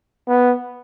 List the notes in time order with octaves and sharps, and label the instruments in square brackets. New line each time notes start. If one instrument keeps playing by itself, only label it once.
[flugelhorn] B3